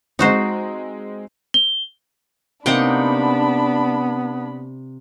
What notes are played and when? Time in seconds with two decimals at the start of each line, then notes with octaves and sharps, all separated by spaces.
0.19 G#3 C4 D#4 F#4 C5
1.54 G7
2.66 C3 A#3 B3 D4 D#4 F#5 G5 B5